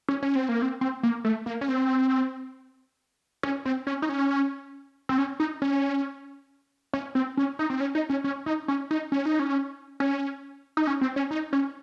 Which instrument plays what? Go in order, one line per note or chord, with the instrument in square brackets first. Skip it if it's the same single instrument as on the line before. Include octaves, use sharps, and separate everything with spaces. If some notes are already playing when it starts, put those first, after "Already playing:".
[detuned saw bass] C#4
C#4
C4
A#3
C4
C4
A#3
A3
A#3
C#4
C4
C#4
C4
C#4
D#4
C#4
C4
C#4
D#4
C#4
C#4
C4
C#4
D#4
C4
C#4
D#4
C#4
C#4
D#4
C#4
D#4
C#4
D#4
C#4
C#4
D#4
C#4
C4
C#4
D#4
C#4